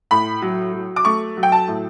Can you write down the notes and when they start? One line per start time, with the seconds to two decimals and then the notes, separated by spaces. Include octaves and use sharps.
0.11 A2 B5
0.42 F#3
0.73 F#3
0.96 D6
1.05 A3 C#6
1.37 F#3
1.43 G5
1.52 A5
1.68 A2